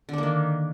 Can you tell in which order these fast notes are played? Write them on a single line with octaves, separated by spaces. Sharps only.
D3 D4 A#3 D#3